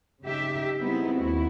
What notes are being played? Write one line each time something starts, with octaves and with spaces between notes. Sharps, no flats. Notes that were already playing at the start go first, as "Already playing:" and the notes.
C#3 D#4 G4 E5
G3 G#3 B3 C4 D#4 E4
D#2 E4 F#4